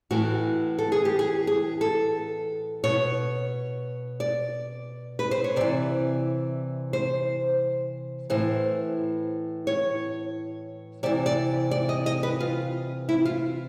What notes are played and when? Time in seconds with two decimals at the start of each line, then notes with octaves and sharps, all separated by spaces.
0.11 A2 E3 F#4
0.79 A4
0.92 G#4
1.05 G4
1.19 G#4
1.47 G#4
1.81 A4
2.84 B2 C#5
4.20 D5
5.19 B4
5.31 C5
5.44 C#5
5.56 C3 E3 D5
6.93 C5
8.30 A2 E3 C5
9.67 C#5
11.03 C3 E3 D5
11.26 D5
11.71 D5
11.89 D#5
12.06 D#5
12.23 B4
12.40 F4
13.09 E4
13.25 F4